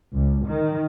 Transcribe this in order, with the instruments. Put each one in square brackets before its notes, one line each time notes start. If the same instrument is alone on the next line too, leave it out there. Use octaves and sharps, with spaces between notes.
[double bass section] C#2
D#3